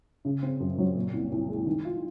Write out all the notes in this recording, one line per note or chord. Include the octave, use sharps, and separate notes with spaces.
C#3
C4
F#2
F#3
A#2
C2
C2
G#3
D#3
F4